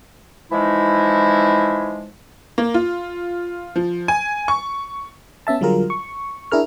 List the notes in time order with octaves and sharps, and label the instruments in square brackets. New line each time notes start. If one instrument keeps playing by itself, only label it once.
[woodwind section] E3 F3 G#3 D#4 E4
[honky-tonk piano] A#3
F4
F3
G#5
C#6
[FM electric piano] B3 C#4 E5 A5
D3 F#3 G3 F4 G#4 A#4
C#6
D4 E4 G#4 A#4 F6